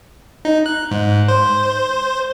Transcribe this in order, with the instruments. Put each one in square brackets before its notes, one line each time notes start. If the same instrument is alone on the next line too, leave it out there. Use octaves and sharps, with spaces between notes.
[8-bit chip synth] D#4
F#6
G#2
C5